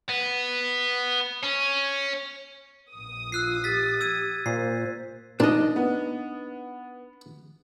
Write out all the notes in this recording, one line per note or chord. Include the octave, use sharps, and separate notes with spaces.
B3
C#4
A#1 D#6
F4 E6 F#6 C7
G4 A6 B6
E6 G#6 D#7
A#2 C5 C7
A#2 D4 D#4 D#5
B3